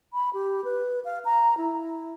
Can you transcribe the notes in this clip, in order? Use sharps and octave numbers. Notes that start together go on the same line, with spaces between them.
B5
G4
B4
F5
A#5
E4